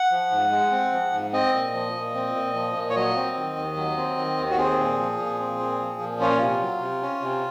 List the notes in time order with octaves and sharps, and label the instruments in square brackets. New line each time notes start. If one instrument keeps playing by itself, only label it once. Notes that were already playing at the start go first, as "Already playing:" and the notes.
Already playing: [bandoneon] F#5
F3
G#2
G#3
C4
F3
G#2
C4 D#5
A#2
F3
A#2
C4
A#2
F3
A#2
C#5
F#3 D#5
C4
D#3
D#2
F#3
C4
D#3
D#2
F#4
C4 G#4
A#2
F3
A#2
C4
A#2
F3
A#2
C#4 F4
C3
F#3
C3
C#4
C3